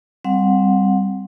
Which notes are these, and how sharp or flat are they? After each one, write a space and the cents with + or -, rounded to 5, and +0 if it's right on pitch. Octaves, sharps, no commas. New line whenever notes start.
G3 +0 C4 +0 F#5 -30